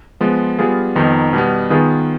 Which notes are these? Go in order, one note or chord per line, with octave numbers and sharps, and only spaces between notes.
F3 G#3 B3
G3 B3 F4 G#4
F2 D#3 B3 D#4
B2 G3 B3
D#3 B3 F4 G#4 B4